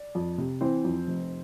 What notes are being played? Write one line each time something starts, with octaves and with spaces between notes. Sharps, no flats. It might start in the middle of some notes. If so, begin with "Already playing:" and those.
Already playing: D5
F2
C3
E3 C4 C5
F2
F1